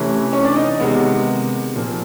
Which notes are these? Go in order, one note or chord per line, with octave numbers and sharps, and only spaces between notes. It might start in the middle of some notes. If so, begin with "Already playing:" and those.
Already playing: C3 E3 A3 C#4
C#4 C#5
D4 D5
D#4 D#5
C3 D#3 G#3 B3
A#2 F3 A#3